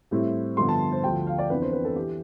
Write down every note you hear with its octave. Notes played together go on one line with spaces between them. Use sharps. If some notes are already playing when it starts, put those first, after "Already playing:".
A2 G3 C4 E4
G2 D3 F3 B3 C6
A5
C5
D2 D3 F3 G5
F5
D5
F2 E3 B3 D4 B4
C5
B4
A4
E3 G4